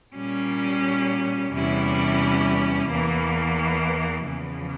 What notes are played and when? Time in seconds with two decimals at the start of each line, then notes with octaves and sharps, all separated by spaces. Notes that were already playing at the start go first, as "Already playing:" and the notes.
0.16 A#2 G3 C#4
1.52 E2 C3 G3 C#4 E4
2.89 E2 E3 A#3
4.26 E2 C#3 F3